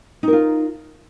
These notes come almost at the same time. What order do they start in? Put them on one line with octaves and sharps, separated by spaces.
D#4 A#4 F4